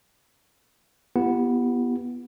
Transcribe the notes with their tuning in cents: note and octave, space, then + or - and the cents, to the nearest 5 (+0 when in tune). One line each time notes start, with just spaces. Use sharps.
B3 -10 E4 +40 G4 +0